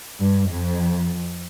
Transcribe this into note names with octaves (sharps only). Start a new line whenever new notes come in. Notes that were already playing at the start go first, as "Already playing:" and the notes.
G2
F2